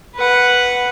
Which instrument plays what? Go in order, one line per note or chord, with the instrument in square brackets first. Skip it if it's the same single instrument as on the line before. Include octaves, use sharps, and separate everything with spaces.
[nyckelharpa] B4 F#5